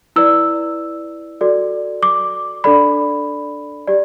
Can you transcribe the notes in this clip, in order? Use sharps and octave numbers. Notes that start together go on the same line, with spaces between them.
E4 B4 D5 E6
F#4 A4 D5
D6
D4 A4 D5 B5
G4 D5